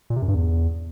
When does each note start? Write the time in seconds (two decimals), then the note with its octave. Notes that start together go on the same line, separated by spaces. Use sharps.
0.10 A#2
0.16 C3
0.22 F#2
0.28 G2
0.34 E2